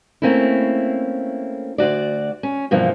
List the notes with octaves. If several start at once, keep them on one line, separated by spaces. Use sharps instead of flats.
A3 A#3 C4 C#4 E4
D2 C#3 F#4 D5
C#4
G2 B2 E3 F3 A#3